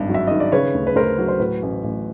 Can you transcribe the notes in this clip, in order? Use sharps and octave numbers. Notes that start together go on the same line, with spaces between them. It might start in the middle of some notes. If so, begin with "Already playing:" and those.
Already playing: G#1 G2
F#3
E5
D#3 D#5
D5
C#3 B4 C#5
D2
B4
D2 A#4 C5
F#3
C5
A2 B4
A1
A1